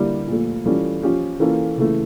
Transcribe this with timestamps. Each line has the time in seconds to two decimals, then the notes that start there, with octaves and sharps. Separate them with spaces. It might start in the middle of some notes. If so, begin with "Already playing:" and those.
Already playing: D3 G3 A#3 E4 G4
0.28 A#2 F3 A3
0.65 E3 G3 C#4 F4 A4
1.03 F3 C#4 G4
1.40 E3 A#3 C#4 F4 A4
1.77 C#3 E3 A3 E4